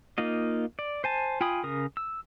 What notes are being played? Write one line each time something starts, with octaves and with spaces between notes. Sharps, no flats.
A#3 D#4 F4 D#5
D5
C5 G#5 A5
F4 G5 G#5 B5 D#6
C#3 A#4 D#6
E6